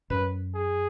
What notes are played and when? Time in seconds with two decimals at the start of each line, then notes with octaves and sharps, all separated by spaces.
0.10 F#2 B4
0.55 G#4